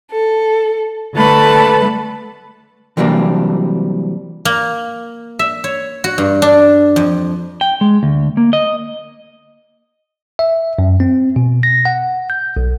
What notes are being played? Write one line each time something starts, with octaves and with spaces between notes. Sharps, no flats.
A4
D3 A3 B4 A5 B5
C3 E3 F#3 G3 A#3 D4
A#3
E5
C#5
F#4
G2
D4
F2
G5
G#3
D2
A#3
D#5
E5
F#2
C4
B2
A#6
F#5
G6
B1